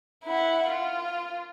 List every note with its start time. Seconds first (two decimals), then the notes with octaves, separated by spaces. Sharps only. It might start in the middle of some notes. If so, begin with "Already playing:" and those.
0.24 E4 F#5
0.69 F4